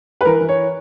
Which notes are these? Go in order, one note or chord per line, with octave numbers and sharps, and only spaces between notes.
B4
E3 A#4
E3
C#5